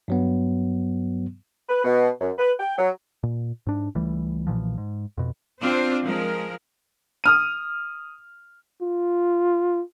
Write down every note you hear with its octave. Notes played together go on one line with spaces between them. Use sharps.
G2 F#3 B3
B4
B2
F#2
B4
G5
F#3
A#2
G#2 D4
C#2 E3 G3 A3
B1 A#2 E3 F3
G#2
F2 B2
C4 D4 F4 C5
F3 G#3 A#4
D#6 F6 D#7
F4